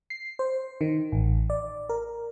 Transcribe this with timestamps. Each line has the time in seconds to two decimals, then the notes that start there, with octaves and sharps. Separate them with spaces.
0.10 C7
0.39 C5
0.81 D#3
1.12 A1
1.50 D5
1.89 A#4